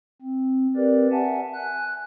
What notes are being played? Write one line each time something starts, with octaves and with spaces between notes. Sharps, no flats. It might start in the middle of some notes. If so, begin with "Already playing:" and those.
C4
C4 G4 A#4 B4 D5
E5 F#5 G#5 A5
G#5 F#6